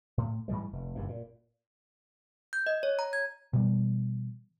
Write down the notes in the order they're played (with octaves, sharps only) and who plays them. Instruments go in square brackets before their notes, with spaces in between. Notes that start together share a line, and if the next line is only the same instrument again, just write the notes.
[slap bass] A2
G#2 E3 G3 G#3
F1
F#1 G2 A#2
A#2
[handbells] G6
D#5
C#5
A#5
G#6
[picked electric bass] B2 E3 G3